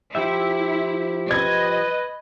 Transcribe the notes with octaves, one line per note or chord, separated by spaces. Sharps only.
F3 E4 G4 E5
B4 D#5 G#6